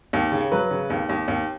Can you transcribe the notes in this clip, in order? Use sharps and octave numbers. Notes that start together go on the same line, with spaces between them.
D#2
C#3
F#3 B4
C#3
D#2
D#2
D#2